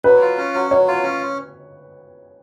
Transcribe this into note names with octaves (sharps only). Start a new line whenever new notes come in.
F#3 B4
F4
C#4
F#3
F#3 C#5
F4
C#4